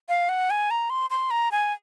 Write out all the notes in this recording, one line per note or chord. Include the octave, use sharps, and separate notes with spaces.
F5
F#5
G#5
A#5
C6
C6
A#5
G#5